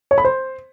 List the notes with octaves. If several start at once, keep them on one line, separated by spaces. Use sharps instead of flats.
C#5
B5
C5